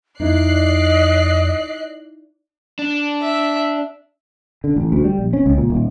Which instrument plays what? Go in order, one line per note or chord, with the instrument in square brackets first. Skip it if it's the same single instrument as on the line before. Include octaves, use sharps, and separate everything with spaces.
[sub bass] F2 [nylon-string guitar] D#4 E4 [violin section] D5 F#6 C7 [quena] D#5
[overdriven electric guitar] D4
[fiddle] E5
[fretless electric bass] D3
A1
D2
G3
A#1
C#4
C#2
A#2
D#1